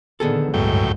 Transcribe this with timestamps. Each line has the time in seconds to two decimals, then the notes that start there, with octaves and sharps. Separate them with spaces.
0.20 A#2 D3 D#3 B3 G#4 A4
0.54 G1 C#2 F#2 A2 G#3 G5